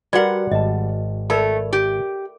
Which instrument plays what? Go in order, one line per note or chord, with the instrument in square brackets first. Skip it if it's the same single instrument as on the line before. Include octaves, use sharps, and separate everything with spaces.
[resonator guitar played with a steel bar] G3 F#5 [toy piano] F#4 D5 [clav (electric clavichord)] A#4 B4
[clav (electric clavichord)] G#1 A5 [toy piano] D#5
[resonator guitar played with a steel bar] A3 [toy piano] A#4 D5 B5
[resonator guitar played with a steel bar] G4